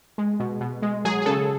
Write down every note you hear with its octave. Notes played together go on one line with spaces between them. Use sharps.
G#3
B2
B2
G#3
F#3 G#4
G#4
C#3 A4